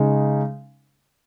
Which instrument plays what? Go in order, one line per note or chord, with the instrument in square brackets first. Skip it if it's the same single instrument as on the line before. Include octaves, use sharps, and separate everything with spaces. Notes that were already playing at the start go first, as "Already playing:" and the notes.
Already playing: [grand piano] C#3 G#3 D#4